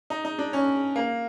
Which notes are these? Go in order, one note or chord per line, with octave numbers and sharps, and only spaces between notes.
D#4
D#4
D4
C#4
A#3